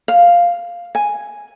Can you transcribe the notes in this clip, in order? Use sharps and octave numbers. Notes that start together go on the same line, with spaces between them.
F5
G#5